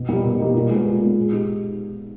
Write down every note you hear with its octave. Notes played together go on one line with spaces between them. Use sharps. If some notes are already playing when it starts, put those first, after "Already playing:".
Already playing: B2
G3 A#3 D#4 G4
B2
G3 A#3 D#4 G4
A#2
G#3 B3
A#2
G#3 B3
G#3
D#4 G4